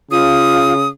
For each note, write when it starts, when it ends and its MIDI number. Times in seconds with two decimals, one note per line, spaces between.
0.11 0.89 49
0.11 0.73 65
0.11 0.88 87